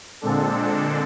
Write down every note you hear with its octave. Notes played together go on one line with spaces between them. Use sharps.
A#2 D3 G#3 C4 D4 A4